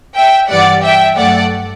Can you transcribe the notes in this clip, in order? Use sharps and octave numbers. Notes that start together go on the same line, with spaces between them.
E5 G5
G2 E3 G3 D5 F#5
E5 G5
G2 F#3 A3 D5 F#5